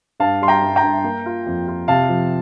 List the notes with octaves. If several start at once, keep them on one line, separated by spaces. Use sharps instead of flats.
G2 F5 A5
G3 C6
G5 A#5
G2
G5 A#5
G2
A#3
F4
F2
F4
C3 F5 A5
F3